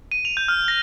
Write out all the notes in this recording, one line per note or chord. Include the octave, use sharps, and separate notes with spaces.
D#7
F7
G6
F6
A#6